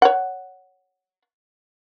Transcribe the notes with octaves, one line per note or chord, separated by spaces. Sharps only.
C#5 F#5